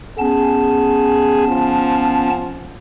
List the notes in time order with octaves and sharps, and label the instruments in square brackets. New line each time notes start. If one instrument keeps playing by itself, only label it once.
[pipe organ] B3 C#4 A5 [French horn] G#4
[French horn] F3